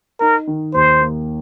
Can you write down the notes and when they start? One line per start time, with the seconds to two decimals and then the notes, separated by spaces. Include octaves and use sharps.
0.20 D#4 A#4
0.47 D#3
0.74 D#2 C5
1.01 A#3